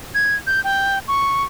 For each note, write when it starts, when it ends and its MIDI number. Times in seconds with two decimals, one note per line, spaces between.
0.15 0.35 92
0.47 0.63 91
0.64 0.99 79
1.08 1.43 85